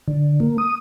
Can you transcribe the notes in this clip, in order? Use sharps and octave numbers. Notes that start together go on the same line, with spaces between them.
D3
A#3
D#6